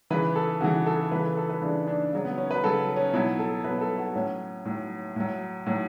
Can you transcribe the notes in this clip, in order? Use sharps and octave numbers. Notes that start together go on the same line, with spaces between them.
C#3 E3 B4
A4
C#3 E3 F#4
A4
C#3 E3 B4
A4
A4
B4
C#3 E3 D4
D4
C#3 F#3
B3
C#4
B4
C#3 F#3 A4
C#4
B2 F#3 E4
A4
B2 F#3 B4
A4
F#4
A2 F#3 C#4
A2 F#3
A2 F#3
A2 F#3